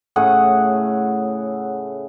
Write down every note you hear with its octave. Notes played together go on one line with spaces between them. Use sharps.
A2 C#3 G#4 F#5